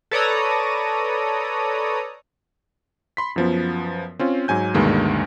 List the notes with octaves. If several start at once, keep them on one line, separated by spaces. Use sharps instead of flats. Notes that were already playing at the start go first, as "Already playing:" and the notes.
A4 B4 C#5 D5 A#5 D#6
B5 C6 B6
F#2 F3 B3
C4 C#4 F4
G#2 F#3 G#5 G6
D2 G2 B2 D#3 G#3 A#3